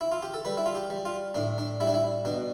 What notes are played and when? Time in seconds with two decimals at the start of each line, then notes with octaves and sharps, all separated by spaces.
0.01 E4
0.12 F4
0.22 G4
0.34 A4
0.45 G3 B4
0.57 E4
0.66 F4
0.75 G4
0.90 G3
1.05 F4
1.35 A2 D4
1.58 D4
1.80 G3 E4
1.87 D4
1.94 E4
2.25 B2 D4